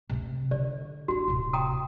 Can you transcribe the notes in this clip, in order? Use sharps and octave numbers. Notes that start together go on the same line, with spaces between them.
C3 A3
D3 D5
D4 E4 F#4
D1 C3
G5 A#5 D#6